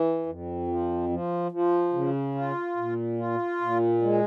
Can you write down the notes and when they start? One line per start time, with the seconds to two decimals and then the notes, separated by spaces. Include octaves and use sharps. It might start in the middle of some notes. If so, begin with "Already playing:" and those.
Already playing: E3
0.26 F2
0.67 F3
1.09 F3
1.51 F3
1.93 C#3
2.35 F4
2.77 A#2
3.19 F4
3.61 A#2
4.02 G#3